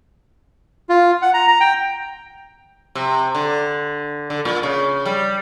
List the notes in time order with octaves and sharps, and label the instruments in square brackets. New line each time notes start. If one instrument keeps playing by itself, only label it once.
[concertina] F4
F#5
A#5
A#5
G5
[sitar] C3
D3
D3
A#2
C#3
G3